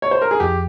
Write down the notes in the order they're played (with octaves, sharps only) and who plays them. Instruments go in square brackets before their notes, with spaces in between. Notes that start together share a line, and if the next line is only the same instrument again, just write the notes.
[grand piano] C#5
C5
A#4
G#4
[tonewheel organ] F2 [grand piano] G4